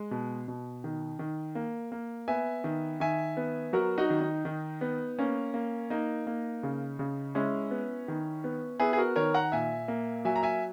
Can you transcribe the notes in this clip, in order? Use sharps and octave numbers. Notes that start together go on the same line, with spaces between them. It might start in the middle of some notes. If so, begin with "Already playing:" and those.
Already playing: G#3
B2
B2
D#3
D#3
A#3
A#3
B3 E5 G#5
D#3
D#3 E5 G#5
B3
F#3 F#4 A#4
D#4 F#4
D#3
D#4
D#3
B3
A#3 C#4
A#3
A#3 D#4
A#3
C#3
C#3
G#3 C#4 E4
B3
D#3
B3
B3 E4 G#4
G#4
F#4 A#4
D#3 A#4 C#5
F#5 A#5
A#2 E5 G#5
A#3
F#3 E5 G#5
A#5
E5 G#5